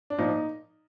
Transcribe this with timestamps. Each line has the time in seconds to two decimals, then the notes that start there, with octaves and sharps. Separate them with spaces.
0.10 D4
0.18 A#2 F3 D#4